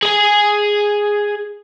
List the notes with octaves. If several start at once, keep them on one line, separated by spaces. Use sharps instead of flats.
G#4 G#5